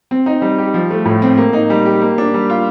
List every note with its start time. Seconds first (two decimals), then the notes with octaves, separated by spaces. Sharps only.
0.11 C4
0.26 D#4
0.42 G3
0.58 G4
0.74 F3
0.91 A3
1.05 A2
1.22 C4
1.38 A#3
1.53 D#4
1.70 G3
1.86 G4
2.02 A#3
2.18 D4
2.34 G3
2.50 F4